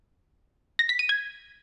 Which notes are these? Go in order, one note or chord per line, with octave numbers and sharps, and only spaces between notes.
A#6
B6
D#7
G#6